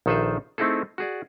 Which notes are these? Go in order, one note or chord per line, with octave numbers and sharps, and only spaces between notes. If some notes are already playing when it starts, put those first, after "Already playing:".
A#1 D#3 A4 B4 C5 E5
A3 C4 D#4 E4 G#4 A4
F#4 G#4 D5